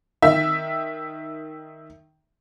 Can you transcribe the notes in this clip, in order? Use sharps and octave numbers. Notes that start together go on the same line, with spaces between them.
D#3 E5